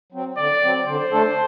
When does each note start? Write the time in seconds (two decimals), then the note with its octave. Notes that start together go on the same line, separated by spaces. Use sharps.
0.12 F#3 C4
0.37 D3 D5
0.62 F#3 C4
0.86 D3 C5
1.11 A3 D4 A4